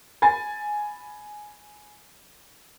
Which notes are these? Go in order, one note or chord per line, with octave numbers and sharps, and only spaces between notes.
G#5 B5 A6